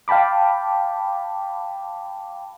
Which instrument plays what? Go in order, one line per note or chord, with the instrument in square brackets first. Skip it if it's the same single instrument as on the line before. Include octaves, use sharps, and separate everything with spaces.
[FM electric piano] F5 G5 A5 B5 D6